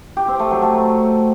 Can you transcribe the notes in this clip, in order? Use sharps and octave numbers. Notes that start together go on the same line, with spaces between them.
G4
C4
A3
F#3
A3